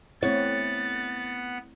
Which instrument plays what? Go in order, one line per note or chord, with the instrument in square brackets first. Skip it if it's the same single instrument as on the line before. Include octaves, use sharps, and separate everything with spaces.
[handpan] A3 C4 E4 [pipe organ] B3 F#5 [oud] C#5 [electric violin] A6